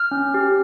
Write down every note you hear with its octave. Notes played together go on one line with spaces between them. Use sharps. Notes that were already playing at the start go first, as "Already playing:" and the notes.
Already playing: F6
C#4
G4